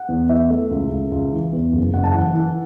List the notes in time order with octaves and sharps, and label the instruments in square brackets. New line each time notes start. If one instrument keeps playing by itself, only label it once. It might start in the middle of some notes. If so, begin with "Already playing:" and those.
Already playing: [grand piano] F#5
E2
E2 E5
A3
C#2
C#2
C#2
E3
E2
F#1
F#1 F#5
A5
E3 F#5
E3